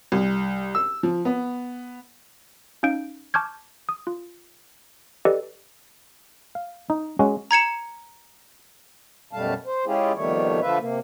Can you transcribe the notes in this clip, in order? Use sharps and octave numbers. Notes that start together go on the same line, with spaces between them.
C2
E6
F3
B3
C#4 D#4 F5 G6 D7
A5 C#6 D6 F6 G6 G#6
D#6
F4
G4 A4 B4 D5 D#5
F5
D#4
G#3 C#4 F#4
A#5 G#6 C#7 E7
F#2 B2 G3 A3 F5 A5
C5
G#3 C#4 E4 F4 G4 G#4
F2 B2 D#3 G3 A3 C#5
D3 F3 A3 F4 B4 E5
C3 A#3